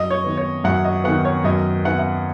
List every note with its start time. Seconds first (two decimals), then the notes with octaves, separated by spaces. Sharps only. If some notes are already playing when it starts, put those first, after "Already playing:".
Already playing: F#2 D#5
0.10 C#5
0.24 D#3 B3
0.37 C#5
0.64 F#2 F#5
0.85 D#5
1.04 D#3 B3 F#5
1.25 C#5
1.44 F#2 D#5
1.85 D#3 B3 F#5
1.99 F#5